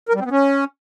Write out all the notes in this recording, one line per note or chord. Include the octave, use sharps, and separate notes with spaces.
A#4
G3
C4
B3
C#4